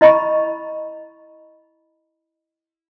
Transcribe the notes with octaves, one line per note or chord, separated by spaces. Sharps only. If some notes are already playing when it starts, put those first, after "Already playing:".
E4 D#5 A#5 B5 C#6